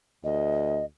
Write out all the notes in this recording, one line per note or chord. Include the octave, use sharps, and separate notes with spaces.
D2 D#5